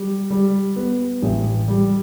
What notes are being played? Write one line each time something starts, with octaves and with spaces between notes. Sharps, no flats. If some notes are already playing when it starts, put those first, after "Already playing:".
Already playing: G3
G3
B3
A1
G3